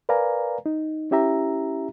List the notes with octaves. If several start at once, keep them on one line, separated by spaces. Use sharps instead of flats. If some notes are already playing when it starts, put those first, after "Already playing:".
A#4 B4 D5 F5 G#5 A#5
D#4
C#4 E4 G4 E5 A#5